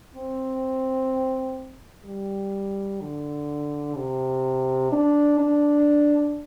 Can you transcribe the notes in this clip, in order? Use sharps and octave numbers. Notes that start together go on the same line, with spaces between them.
C4
G3
D3
C3
D4
D4